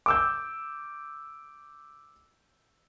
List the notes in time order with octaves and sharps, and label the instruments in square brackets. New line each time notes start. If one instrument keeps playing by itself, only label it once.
[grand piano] D6 E6 G6